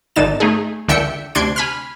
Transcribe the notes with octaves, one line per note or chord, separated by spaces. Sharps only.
G#1 D3 D4 D#4 A6 E7
A3 D#4 G#4
C#2 D3 D4 E5 G5 C#7
D2 C3 D4 C6 G#6 D7
G#5 B5 F6